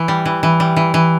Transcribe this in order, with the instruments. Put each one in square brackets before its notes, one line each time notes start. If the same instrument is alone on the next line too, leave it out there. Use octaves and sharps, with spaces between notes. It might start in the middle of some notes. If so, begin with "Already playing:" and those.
Already playing: [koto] E3
G3
E3
E3
G3
E3
E3